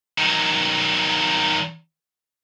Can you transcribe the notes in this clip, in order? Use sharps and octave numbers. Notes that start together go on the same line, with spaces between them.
D#3 F#3